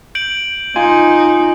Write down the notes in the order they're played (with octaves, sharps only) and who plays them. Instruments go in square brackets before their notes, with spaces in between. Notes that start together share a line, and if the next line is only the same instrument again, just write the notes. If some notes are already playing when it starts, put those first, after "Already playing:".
[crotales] G6 D7 F#7
[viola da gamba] D#4 [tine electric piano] F4 G#5